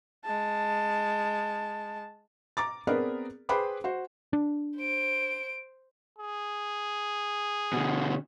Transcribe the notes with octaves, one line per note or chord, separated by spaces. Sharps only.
G#3 A5
A#5 D6 A6
B3 C4 G#4 A#4 B4 D5
G#4 B4 C5 G5 B5 D6
F#4 C5
D4
C5 D7
G#4
B2 D3